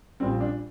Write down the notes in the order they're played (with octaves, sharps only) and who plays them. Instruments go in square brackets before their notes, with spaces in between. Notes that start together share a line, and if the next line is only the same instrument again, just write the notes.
[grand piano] A#1 A#2 G3 C4
D4